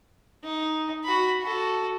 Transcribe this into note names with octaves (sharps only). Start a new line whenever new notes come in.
D#4
F#4 B5
F#4 A4